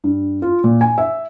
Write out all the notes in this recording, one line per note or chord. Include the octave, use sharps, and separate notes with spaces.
G2
F4
A#2
G#5
E5